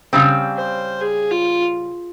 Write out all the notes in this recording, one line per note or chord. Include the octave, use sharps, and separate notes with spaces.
C#3 G3 C4
C5
G#4
F4